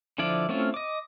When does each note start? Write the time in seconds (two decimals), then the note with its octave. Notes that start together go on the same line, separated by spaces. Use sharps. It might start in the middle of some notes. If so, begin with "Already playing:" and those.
0.18 D3 F3 E4 F4 D5
0.49 A3 C4 C#4 E4 F4
0.74 D#5 D6